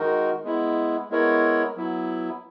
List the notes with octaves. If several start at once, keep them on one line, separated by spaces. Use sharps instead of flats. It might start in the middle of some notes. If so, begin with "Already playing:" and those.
Already playing: D#3 G#3 D#4 F#4 A#4
G#3 B3 E4
G#3 B3 E4 A#4 C#5
F#3 B3 E4